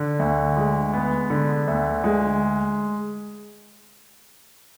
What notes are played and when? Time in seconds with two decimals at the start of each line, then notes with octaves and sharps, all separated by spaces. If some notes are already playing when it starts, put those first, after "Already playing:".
Already playing: D3
0.19 D2
0.57 G#3
0.93 B3
1.30 D3
1.68 D2
2.04 G#3